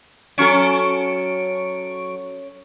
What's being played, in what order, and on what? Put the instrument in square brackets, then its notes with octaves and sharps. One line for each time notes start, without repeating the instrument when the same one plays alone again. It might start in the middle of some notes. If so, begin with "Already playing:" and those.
[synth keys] F#3 C#6 D7 [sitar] C#4 A4